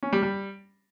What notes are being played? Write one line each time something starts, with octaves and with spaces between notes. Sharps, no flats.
C#4
G3
G3